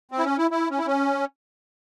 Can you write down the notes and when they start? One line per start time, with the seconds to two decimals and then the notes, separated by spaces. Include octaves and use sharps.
0.12 C4
0.19 E4
0.25 C#4
0.38 E4
0.51 E4
0.71 C#4
0.78 E4
0.87 C#4